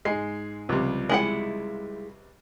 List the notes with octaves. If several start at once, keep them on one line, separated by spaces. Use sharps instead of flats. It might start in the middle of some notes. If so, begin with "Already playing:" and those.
G#2 G#3 G#5 C7
C#2 C3 F3 G3
G#3 E4 F#5